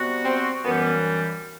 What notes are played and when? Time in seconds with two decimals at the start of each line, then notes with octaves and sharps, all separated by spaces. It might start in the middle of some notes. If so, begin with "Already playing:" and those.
Already playing: C3 G3 B3 F#4
0.24 C4
0.65 F#2 E3 G3 B3